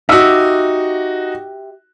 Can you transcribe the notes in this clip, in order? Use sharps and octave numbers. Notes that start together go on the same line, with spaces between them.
D#4 F#4 G4 E5